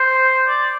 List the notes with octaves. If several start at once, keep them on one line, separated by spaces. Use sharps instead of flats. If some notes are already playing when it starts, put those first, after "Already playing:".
Already playing: C5
D5